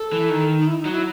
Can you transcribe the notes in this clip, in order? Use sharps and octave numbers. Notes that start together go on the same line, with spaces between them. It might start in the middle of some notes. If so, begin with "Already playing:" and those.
Already playing: A4
E3
D#3
D#4
E4
D#4
F#3
E4